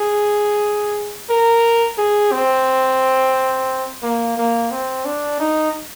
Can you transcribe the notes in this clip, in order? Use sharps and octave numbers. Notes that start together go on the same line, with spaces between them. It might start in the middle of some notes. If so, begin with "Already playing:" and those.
Already playing: G#4
A#4
G#4
C4
A#3
A#3
C4
D4
D#4